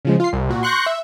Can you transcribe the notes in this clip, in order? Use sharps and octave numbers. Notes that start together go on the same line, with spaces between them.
C#3 F3 G#3
F4 C7
C2
A#2 F#4
C6 C#6 F#6 G6 A#6 C#7
E5